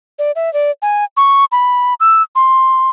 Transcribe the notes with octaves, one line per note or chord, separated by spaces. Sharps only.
D5
E5
D5
G#5
C#6
B5
E6
C6